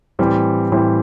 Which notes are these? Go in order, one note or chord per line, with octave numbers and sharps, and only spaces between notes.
A2 E3 G3 C4
A2 E3 G3 C4